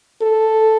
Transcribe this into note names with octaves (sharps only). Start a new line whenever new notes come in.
A4